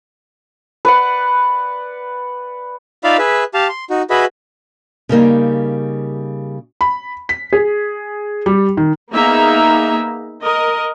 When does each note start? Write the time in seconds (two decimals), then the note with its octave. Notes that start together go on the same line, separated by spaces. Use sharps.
0.85 B4 D5 F#5
3.04 D#4 F4 D5 E5 F5 B5
3.18 G#4 B4 E5
3.54 G4 F5 A5
3.69 C6
3.90 D#4 F#4
4.10 F#4 G#4 B4 D#5 E5 B5
5.09 C#3 G3 A#3 D#4
6.81 B5
7.29 B6
7.53 G#4
8.46 G3
8.77 D#3
9.12 A#3 B3 D#4 G#4 E5 A#5
10.42 A#4 D#5